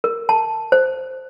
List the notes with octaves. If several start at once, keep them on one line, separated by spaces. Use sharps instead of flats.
A#4
A5
C5